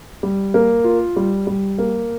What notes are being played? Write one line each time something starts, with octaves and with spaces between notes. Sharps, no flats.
G3
A#3
F4
G3
G3
A#3